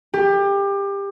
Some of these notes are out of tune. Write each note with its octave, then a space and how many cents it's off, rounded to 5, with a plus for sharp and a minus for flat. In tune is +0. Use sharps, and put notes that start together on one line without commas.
G4 +25